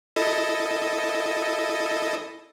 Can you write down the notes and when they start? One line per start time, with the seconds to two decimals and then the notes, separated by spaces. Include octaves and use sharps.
0.16 E4 A4 D#5